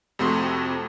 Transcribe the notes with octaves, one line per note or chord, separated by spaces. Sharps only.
F2 C3 A3 F#4 C6 D#6